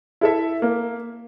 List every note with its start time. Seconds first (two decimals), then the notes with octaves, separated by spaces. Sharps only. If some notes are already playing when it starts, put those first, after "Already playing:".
0.21 E4 A4 E5
0.62 A#3